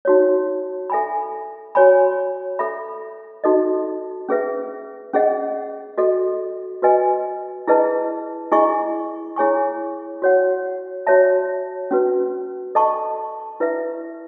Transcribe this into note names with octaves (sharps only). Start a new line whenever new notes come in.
D#4 F#4 C#5
A4 E5 G#5 B5
F#4 C#5 G#5 B5
A4 E5 B5
D#4 F#4 A4 D#5
C#4 G#4 B4 E5
C#4 G#4 D#5 F#5
F#4 A4 D#5
F#4 B4 D#5 G#5
E4 G#4 B4 D#5 A5
E4 G#4 D#5 G#5 C#6
E4 G#4 C#5 G#5 C#6
F#4 C#5 F#5
F#4 C#5 E5 A5
C#4 F#4 B4
A4 D#5 A5 C#6
E4 B4 E5